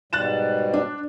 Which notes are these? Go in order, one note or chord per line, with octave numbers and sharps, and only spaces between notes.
G#2 B2 G3 F#6 A6 E7
D4